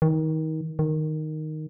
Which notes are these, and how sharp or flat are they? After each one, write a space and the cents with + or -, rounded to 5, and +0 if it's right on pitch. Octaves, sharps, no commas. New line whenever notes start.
D#3 +25
D#3 -5